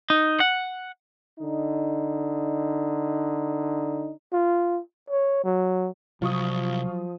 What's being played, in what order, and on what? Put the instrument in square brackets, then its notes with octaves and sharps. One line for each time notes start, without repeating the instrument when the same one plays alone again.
[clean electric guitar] D#4
F#5
[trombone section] D3 D#4
[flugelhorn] F4
C#5
F#3
[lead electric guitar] C2 [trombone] F3 [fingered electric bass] F#3 [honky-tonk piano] F4 C#6 D#6